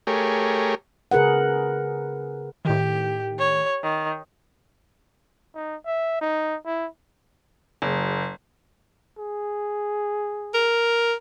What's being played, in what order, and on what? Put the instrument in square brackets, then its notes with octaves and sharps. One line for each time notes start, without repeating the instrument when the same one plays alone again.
[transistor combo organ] A3 G4 G#4 A#4 C#5
[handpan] C#3 G#4 A#4 B4 F#5
[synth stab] A2 D#3 [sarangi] G4
[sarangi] C#5
D#3
[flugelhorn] D#4
E5
D#4
E4
[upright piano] F#1
[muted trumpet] G#4
[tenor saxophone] A#4